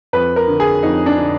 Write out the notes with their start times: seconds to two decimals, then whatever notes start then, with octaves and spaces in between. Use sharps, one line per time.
0.13 F2 B4
0.36 A#4
0.48 D3
0.60 G#4
0.83 F2 D#4
1.06 D4
1.18 D3